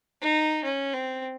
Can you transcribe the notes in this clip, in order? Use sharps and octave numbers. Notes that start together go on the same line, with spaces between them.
D#4
C#4
C4